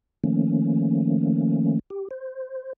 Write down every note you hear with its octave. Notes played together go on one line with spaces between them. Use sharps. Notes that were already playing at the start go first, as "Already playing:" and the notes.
D#3 F3 A3 A#3 C#4
G4
C5